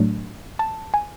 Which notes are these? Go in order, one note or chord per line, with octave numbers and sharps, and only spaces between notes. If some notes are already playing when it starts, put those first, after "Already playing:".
Already playing: A2 F#3 A3 D4
A5
G#5